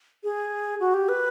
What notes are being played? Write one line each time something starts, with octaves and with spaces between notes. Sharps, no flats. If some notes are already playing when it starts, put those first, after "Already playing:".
G#4
F#4
G4
B4